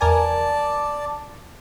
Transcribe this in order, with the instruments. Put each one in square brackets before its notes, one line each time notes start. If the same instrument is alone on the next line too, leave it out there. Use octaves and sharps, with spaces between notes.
[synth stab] E2 A#4 G#5 [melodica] D5 A5